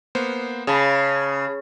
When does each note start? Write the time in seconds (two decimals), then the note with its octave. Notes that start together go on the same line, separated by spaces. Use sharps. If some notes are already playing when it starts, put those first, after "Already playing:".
0.15 A#3 B3 C5
0.67 C#3 G#4 A5 B5